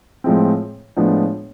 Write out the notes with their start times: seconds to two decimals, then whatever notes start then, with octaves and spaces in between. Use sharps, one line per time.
0.24 A2 F3 G#3 C4
0.97 A2 F3 G#3 B3 D4